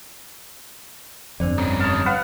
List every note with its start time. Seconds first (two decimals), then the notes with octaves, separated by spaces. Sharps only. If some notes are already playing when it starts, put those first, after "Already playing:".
1.40 G1 F2 D4 C5 D5
1.58 G3 C#4 D#4
1.80 C#5 A5 D#6 F6
2.06 B4 F5 F#5